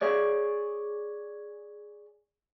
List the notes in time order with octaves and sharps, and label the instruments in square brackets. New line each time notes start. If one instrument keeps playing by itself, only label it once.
[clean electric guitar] G#4 C#5 D5